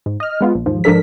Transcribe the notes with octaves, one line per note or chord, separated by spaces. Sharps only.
G#2
D#5 F6
G#3 B3 F4
A#1
D#2 G#2 F3
G#2 F3 D4 A4 A#4 B6